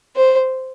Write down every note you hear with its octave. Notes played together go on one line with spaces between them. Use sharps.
C5